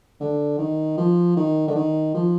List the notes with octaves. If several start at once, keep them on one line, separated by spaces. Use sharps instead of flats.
D3
D#3
F3
D#3
D3
D#3
F3